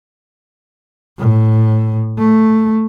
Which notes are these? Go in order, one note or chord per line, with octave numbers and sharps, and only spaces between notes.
A2
A3